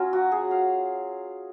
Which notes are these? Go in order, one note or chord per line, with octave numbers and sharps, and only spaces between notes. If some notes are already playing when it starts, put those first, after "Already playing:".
Already playing: F#3 C#4 F4
F#4
G#4
F5